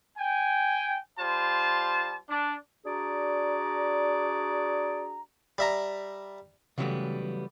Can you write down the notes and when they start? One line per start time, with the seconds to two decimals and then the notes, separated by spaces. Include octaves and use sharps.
0.17 G5 G#5
1.19 G3 F4 C5 A5
2.29 D4
2.85 D4 F#4 G#4 D5 A#5
5.58 G3 E5 A#5
6.78 C#3 E3 F#3 G3 A3 B3